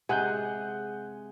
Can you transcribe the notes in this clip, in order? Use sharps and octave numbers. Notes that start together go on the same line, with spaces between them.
C3 G#3 G#4 F#5 G#5 F#6 G6